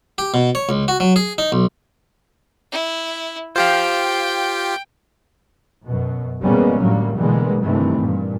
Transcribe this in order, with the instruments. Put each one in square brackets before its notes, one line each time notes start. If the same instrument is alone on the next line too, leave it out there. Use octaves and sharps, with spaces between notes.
[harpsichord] G4
B2
C#5
C#2
F#4
F#3
G#4
D#4
B1
[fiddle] E4
[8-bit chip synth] F4 G4 [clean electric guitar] C5 F5 [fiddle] G5
[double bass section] F#2 B2
B2 E3 G3 G#3 A#3 C#4
A2 D3 F#3 G3 A#3
B2 D3 E3 G3 G#3 A#3
G2 C3 D#3 E3 A3 C4
G2 A#2